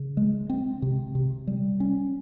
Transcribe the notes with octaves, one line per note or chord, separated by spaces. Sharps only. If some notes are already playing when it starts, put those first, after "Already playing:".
Already playing: C#3
G#3
C4
C3
C3
G3
C#4